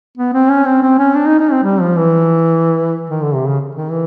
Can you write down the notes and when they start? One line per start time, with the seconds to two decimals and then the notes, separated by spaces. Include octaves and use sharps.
0.18 B3
0.34 C4
0.50 C#4
0.66 C4
0.83 C4
0.99 C#4
1.15 D4
1.27 D#4
1.39 D#4
1.52 C4
1.64 G3
1.81 F3
1.96 E3
3.10 D#3
3.22 D3
3.35 C3
3.47 C#3
3.75 D#3
3.91 E3